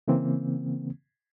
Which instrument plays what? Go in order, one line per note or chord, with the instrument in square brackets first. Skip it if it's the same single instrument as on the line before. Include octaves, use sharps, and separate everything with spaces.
[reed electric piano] C#3 E3 A#3 C4